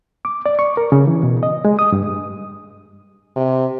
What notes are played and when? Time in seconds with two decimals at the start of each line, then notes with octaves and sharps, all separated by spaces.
0.25 D6
0.46 D5
0.59 C#6
0.77 A#4
0.92 C#3
1.07 E3
1.23 B2
1.43 D#5
1.65 G#3
1.79 D#6
1.92 G2
3.36 C3